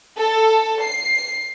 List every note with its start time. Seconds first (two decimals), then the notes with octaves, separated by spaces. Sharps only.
0.17 A4
0.83 C7